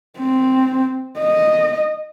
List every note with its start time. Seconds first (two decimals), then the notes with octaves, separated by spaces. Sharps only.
0.19 C4
1.20 D#5